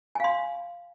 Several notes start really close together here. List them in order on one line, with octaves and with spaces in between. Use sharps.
G#5 F5 C6